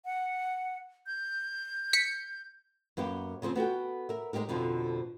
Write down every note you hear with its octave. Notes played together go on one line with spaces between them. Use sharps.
F#5
G6
B6 C#7
F#2 A#3 B3 G4
C#3 F3 A#3 C4
B3 F#4 A4 G5
A#4 E5
G#3 C4 D#4 G4 A#4
F2 B2 D3 F3 D#4